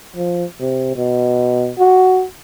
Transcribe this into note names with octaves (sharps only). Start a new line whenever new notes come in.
F3
C3
B2
F#4